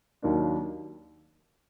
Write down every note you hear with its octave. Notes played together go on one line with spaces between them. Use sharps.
D#2 D#3 F#3 A#3 D4